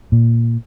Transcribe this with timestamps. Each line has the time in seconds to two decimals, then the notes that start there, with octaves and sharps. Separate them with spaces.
0.12 A#2